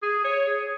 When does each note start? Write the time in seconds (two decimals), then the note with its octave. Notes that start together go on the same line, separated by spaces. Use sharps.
0.02 G#4
0.24 C#5
0.47 G#4